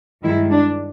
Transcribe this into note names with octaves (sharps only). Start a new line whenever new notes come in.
G2 D#3 G#3 E4
D4